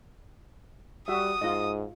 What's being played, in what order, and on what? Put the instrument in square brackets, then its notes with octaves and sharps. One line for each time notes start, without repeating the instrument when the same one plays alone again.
[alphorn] G3 [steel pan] F#4 E5 [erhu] D#6
[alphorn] G#2 [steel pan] F4 D#5